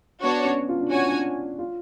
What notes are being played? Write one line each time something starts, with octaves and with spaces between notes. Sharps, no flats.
B3 D4 F#4 C#5
C#4
F4
D4
C#4 F#4 C#5 G#5
D4
F4